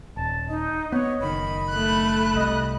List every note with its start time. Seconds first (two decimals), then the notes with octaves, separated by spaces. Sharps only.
0.17 D#1 A5
0.49 D#4 D#5
0.92 B3 C#5
1.21 F#1 D#3 B5
1.70 A3 F#6
2.36 C2 D#5